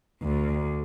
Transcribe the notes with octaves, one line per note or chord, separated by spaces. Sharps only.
D2